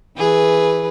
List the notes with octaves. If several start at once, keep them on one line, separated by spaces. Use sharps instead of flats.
E3 G#4 B4